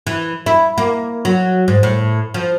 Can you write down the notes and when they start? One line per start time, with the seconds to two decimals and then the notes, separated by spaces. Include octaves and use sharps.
0.07 E3
0.46 E4
0.78 A#3
1.25 F#3
1.68 G#2
1.83 A2
2.34 F3